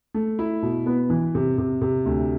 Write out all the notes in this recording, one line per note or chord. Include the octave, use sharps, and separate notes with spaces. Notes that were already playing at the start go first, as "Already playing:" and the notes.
A3
E4
B2
B3
E3
C3
C3
C3
D2